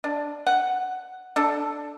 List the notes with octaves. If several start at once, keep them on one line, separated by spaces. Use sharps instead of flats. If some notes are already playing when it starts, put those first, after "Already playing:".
D4
F#5
D4 A4